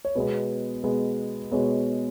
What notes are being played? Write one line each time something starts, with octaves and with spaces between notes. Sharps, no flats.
C#5
B2 G#3 B3 B4
B2 G#3 B3
B2 G#3 B3 C#5